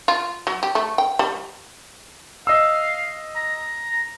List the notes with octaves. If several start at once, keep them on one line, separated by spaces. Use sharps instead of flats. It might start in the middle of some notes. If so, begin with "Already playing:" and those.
F4
F#3
G4
A3
G5
G3
D#5 F5 E6
A#5